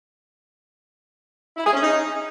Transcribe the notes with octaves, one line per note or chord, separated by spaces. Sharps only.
E4
G#4
C#4
D#4